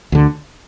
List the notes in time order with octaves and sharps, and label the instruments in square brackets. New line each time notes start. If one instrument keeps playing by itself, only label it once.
[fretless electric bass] D2 D3